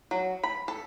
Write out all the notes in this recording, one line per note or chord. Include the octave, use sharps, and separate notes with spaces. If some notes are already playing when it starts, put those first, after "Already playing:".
F#3
B5
A4